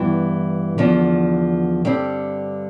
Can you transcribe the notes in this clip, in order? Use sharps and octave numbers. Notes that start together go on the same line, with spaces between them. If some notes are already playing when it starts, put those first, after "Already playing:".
Already playing: G2 E3 B3
E2 D3 F3 B3
G2 D3 G3 C4